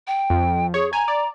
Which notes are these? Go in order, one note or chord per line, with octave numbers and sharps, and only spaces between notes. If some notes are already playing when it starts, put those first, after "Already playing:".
G5
F2
G#4 C#5
G#5 A#5
D5